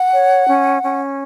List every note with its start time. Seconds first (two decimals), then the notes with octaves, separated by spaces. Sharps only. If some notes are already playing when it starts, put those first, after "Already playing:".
Already playing: F#5
0.12 C#5
0.48 C#4
0.83 C#4